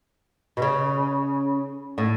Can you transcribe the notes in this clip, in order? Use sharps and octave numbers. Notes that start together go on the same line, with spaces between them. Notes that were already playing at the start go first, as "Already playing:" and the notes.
B2
C#3
A2